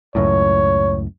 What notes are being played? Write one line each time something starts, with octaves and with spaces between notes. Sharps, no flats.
C#2 F#2 A2 C#5